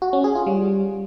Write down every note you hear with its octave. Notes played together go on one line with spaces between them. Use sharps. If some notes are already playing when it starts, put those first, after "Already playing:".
F#4
C#4
G#4
F4
G3